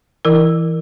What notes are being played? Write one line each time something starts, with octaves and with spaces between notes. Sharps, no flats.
E3 E4 A#4